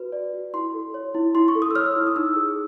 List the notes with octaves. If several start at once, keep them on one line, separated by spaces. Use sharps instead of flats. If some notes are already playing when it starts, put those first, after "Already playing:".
Already playing: F#4 B4
D5
F#4
E4 C6
A4
C#5
E4
E4 C6
C#6
A4
D#6
E6
C#5 F6
E4
D#6
D#4 E6
G#4